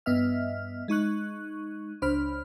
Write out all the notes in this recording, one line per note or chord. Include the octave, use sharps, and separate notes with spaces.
G2 B3 D#5 E5 F6
G#3 D#4 C#6 F#6
C#2 D4 C5 B5 F6